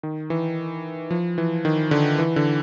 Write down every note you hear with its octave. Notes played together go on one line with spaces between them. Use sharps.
D#3
E3
F3
E3
D#3
D3
E3
D3